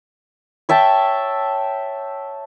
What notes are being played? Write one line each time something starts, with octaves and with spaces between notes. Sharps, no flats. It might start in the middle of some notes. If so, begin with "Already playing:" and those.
C#5 E5 G5 A5